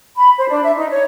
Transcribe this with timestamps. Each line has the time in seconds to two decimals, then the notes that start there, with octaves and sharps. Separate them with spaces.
0.16 B5
0.37 C5
0.49 D4
0.64 E5
0.76 D#4
0.89 C#5